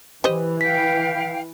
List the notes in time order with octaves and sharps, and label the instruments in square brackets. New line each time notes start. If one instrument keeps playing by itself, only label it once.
[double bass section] E3 [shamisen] G4 C5 D#5
[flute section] F5 G5 [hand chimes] B6